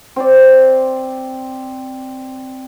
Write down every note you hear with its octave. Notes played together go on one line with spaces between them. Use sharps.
C4 C5 D5